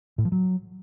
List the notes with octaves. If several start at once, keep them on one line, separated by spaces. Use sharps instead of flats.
A2
F3
F#3